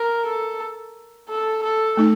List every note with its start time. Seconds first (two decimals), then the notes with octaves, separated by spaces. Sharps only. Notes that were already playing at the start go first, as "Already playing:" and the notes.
Already playing: A#4
0.26 A4
1.29 A4
1.63 A4
1.97 A3 D#4